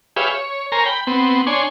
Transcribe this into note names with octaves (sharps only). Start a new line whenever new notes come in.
G4 G#4 B4 C#5 E5 F5
C#5
A#4 C5 C#5 G#5 A#5
G5 B5
B3 C4
D4 C#5 G#5 C6